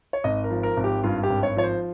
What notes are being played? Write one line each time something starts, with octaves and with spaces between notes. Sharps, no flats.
C#5
G#1 D#5
A#4
F3
A#4
G#1
G4
G2 F4
G4
G#1
C#5
F3 C#5
C5